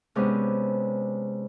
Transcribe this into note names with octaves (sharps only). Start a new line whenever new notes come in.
C3 G#3 B3 C#4 D4